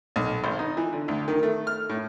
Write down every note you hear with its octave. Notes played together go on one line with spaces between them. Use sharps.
B1
G#1
D#4
E3
D3
D2
D#3
A3
F6
A2